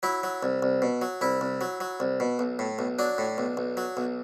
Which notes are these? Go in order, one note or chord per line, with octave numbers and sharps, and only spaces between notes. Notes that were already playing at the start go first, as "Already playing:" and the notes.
F#3 E4
F#3
C2
C2
B2
F#3
C2 E4
C2
F#3
F#3
C2
B2
B1
A2
B1
F#3 D4
A2
B1
B1
F#3
B1